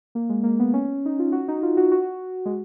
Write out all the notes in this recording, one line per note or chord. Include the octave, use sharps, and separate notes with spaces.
A#3
G#3
A#3
B3
C#4
D#4
F4
F#4
D#4
F4
F#4
F#4
G#3